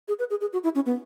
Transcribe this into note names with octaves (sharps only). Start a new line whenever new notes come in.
G#4
B4
G#4
G#4
F#4
E4
C#4
B3